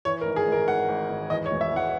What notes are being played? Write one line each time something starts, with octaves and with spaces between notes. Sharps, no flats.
E3 C#5
A#4
G#1
G#4
G#1 A#4
G#1 F#5
G#1
G#1
E2 D#5
C#5
E1
E5
E2
F#5